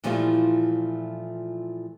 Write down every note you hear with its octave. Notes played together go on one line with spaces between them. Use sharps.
A#2 E3 F3 G3 A3 F4